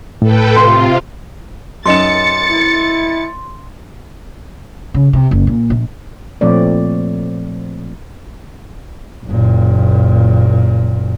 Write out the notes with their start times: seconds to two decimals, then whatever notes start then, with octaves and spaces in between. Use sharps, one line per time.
0.22 A2 A4 B4 G5
0.56 C3 F4 G5 C6
1.86 F#2 D#4 C6 A6 C#7 E7
2.49 E4
4.94 C#3
5.13 C3
5.31 F#1
5.47 A#2
5.70 A#1
6.41 A#2 F3 A3 C4 C#5 D5
9.26 F#1 A#2